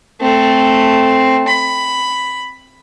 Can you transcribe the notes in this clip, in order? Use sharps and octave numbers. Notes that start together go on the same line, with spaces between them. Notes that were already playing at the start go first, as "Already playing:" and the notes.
A3 C4
B5